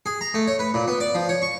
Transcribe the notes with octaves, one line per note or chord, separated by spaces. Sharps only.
G#4
A#5
A3
C#5
B4
A#2
B3
D5
F3
C#5
C#6